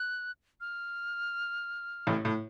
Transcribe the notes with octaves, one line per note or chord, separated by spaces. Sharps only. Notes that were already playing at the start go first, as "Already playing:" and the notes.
Already playing: F#6
F6
A1 A2
A2